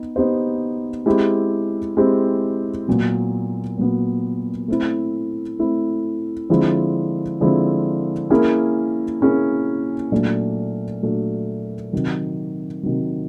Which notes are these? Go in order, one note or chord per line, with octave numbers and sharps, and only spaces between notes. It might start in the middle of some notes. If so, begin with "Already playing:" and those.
Already playing: B3 D#4
B3 D#4 G4 C5
G#3 C4 E4 G4
G#3 C4 E4 G4
A#2 F#3 B3
A#2 F#3 B3
A3 C4 E4
A3 C4 E4
D3 F3 G#3 C4 E4
D3 F3 G#3 C4 E4
A#3 C#4 E4 G#4
A#3 C#4 E4 G#4
A#2 F#3 A3 D4
A#2 F#3 A3 D4
C3 D#3 F#3
C3 D#3 F#3